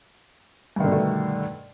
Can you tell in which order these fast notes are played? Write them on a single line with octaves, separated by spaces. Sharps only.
G2 D#3 D3 B2 A3